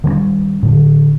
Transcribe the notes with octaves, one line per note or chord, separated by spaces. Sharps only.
D#3 G3 G#3 C#4
A2 D3